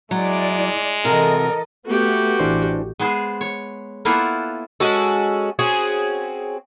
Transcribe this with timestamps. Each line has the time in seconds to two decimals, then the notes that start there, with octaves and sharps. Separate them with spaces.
0.11 F#3 G#3 E4 D5
1.05 C3 E3 F#4 A4 A#4 D#5
1.87 A3 B3 F#4 G4
2.39 A1 E3 D4 C5
3.00 G#3 B3 G#4 C5
3.41 C#5
4.05 A#3 B3 E4 F4 A4 F#5
4.80 G#3 C#4 F#4 A4
5.59 C4 C#4 F#4 G#4